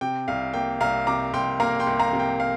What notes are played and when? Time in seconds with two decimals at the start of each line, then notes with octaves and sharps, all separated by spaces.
0.01 C3 G5
0.28 C2 F5
0.53 A#3 G5
0.80 C2 F5 A#5
1.07 C3 A#5 D6
1.33 C2 G5 C6
1.60 A#3 F5 A#5
1.80 G5 C6
1.87 C2
1.99 F5 A#5
2.13 C3
2.19 G5
2.40 F5